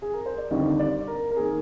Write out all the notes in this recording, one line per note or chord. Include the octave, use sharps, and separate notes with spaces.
G#4
A#4
C5
D5
D#2 D3 G3 C4 D#5
D5
A#4
A#4
D#3 A#3 G#4